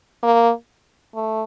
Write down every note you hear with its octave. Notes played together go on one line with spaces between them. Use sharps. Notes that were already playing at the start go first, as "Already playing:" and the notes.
A#3
A3